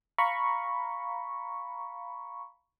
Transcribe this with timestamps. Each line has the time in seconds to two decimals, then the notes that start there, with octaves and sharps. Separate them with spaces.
0.18 F5 A#5 B5 C#6